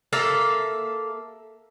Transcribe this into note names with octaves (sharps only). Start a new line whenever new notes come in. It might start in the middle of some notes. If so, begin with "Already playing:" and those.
A#3 A4 E5 F5